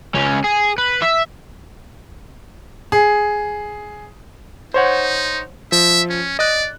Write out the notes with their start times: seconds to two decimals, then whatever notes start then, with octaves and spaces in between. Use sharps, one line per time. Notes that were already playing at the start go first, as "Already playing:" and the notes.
0.15 C#2 C#4
0.44 G#4
0.78 B4
1.02 E5
2.92 G#4
4.74 D#4 C5 C#5 F#5
5.72 F3 E5
6.10 C#4
6.39 D5 D#5 F#6